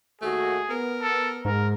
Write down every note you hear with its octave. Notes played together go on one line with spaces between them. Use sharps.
D#2 A3 F#4 G#4
B3 A#4
A4
G#2 A#4